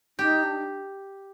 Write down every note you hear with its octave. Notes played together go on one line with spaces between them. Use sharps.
D#4 G4
D4